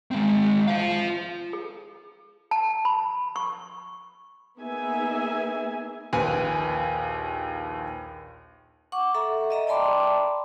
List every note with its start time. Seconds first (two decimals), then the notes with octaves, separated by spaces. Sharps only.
0.11 G#3 C4
0.67 C5 F5
1.53 G#4
2.51 A5
2.85 B5
3.36 C#6
4.60 A#3 B3 D#4 G#4 E5 G#5
6.13 A#1 D#2 B4 G#5
8.92 F#5 C#6 D6
9.15 A4 E5 F#5 A#5
9.50 D#5 E5 A#5
9.67 D5 G5 A5 B5 C6 D6